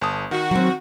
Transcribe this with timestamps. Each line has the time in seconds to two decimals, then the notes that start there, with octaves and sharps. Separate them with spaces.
0.01 G1 A5 D#6
0.31 D#3 F#4
0.51 F#3 C4